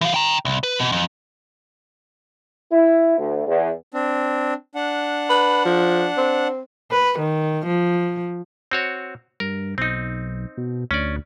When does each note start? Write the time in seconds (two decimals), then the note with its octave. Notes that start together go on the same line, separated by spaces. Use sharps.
0.01 E3 F5
0.14 G5 A#5
0.45 C2
0.63 B4
0.79 B2
0.92 F2
2.71 E4
3.18 D2
3.46 E2
3.94 C4 D4
4.75 D4 F#5
5.29 B4
5.65 F3
6.17 C4
6.91 B4
7.19 D#3
7.66 F3
8.71 C4 F#4 C#5
9.40 G2 A#4
9.78 B1 C4 D#4
10.58 B2
10.91 D2 C#4 D5